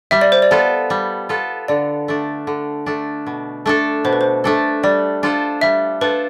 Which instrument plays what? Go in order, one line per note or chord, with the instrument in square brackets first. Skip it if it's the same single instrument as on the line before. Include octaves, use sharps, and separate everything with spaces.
[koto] G3 [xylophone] E5
[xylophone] D5
C5
D5
[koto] B3 F4 A4
G3
B3 F4 A4
[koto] D3 [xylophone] D5
[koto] A3 D4
D3
A3 D4
B2
A3 D4 A4
[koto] B2 [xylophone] C5
[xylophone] B4
C5
[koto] A3 D4 A4
[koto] G3 [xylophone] D5
[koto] D4 F4 A4 C5
[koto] G3 [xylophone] E5
[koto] D4 F4 A4 C5 [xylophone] B4